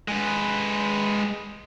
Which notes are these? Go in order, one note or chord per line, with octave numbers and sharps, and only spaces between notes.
G#3 B4